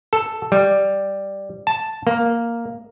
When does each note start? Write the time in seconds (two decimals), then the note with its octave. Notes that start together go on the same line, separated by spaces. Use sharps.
0.13 A4
0.52 G3
1.67 A5
2.07 A#3